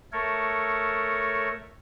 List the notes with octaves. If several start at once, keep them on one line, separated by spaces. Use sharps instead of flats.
A3 A4 A#4 C#5